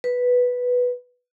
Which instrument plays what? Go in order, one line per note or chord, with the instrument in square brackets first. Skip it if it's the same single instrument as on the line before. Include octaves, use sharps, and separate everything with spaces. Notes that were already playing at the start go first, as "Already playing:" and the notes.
[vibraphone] B4